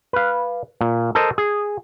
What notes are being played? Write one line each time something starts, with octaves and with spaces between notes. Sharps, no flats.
B4 F5
A#2
A4 A#4 C5 D#5
G#4